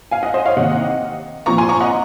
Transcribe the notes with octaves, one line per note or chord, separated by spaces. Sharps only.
F5 G#5
D#5 F#5
C5 D#5
C#5 F5
C3 D#3 A#3 D#5 F#5
A#2 F3 C4 A#5 C#6
G#5 C6
A#5 C#6
D#5 F#5